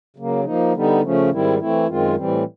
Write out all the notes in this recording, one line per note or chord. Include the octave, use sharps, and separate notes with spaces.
C#3 F#3 A#3
F3 A#3 D#4
D3 G3 B3 D#4
C#3 F3 A3 C#4
G#2 D#3 G3 C4 E4
E3 A3 C4 E4
F#2 D#3 G#3 C4 F4
A2 E3 G3 C4